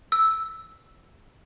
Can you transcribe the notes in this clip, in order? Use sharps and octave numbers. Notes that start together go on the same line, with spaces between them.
E6